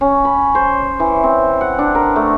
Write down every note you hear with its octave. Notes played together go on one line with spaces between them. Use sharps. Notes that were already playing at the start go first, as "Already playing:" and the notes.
C#4
B5
C5
E3
C4
F#5
D4
A#4
A3